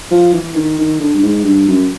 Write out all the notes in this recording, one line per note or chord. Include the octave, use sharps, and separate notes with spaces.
F3
E3
D#3
D#3
D3
G2
G#2
G2
F#2